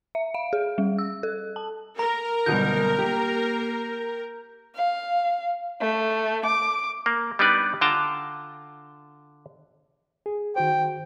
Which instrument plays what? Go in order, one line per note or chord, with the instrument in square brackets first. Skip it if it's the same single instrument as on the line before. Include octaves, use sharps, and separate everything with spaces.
[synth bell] E5
F5
G#4
G3
E6
A4
A5
[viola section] A#4 [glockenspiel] A#5
[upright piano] F#1 B2 D3 [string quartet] G3 [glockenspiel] G6
[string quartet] A#3 [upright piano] G4
[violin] F5
A3
D6
[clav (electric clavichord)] A#3
G3 B3 D4 D#4 B4 D5
D3 F4 G5 A5 A#5
[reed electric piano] G#4
[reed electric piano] D#3 F#4 C5 [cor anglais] G5